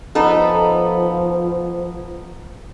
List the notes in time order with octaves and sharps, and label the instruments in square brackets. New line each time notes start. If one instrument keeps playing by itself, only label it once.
[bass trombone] F3 [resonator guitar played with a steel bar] B3 D#4 A4